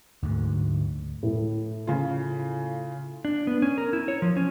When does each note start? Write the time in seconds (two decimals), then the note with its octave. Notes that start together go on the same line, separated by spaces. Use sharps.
0.22 D2 G#2 D3
1.23 A2
1.87 C#3 F4
3.25 D4
3.47 B3
3.62 C#4
3.78 A#4
3.93 E4
4.08 C#5
4.22 F3
4.37 C#4